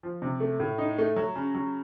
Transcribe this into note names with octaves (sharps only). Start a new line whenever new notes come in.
F3
C3
A3
A2
D#4
A3
F#3
C#3
F#3